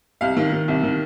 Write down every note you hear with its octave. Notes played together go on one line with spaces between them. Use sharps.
C2 F5
D#3
D#3
C2
D#3